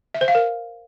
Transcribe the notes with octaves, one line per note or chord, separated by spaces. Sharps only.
E5
C5
F5
A#4